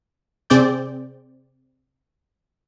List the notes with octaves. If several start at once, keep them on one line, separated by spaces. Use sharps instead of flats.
C3 C4 G#4 D5 G6